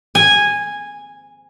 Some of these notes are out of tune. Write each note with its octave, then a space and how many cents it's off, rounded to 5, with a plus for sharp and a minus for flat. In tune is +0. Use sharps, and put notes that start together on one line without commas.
G#5 -10